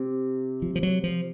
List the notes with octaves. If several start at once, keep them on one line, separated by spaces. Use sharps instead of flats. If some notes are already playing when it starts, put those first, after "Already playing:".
Already playing: C3
F3
F3
F#3
F3